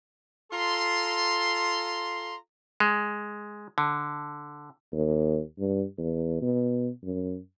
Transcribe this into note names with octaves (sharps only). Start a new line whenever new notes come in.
F4 A4 A#5 C6
G#3
D3
D#2
G2
E2
B2
F#2